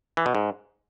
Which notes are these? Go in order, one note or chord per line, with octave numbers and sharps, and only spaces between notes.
E3
B2
G#2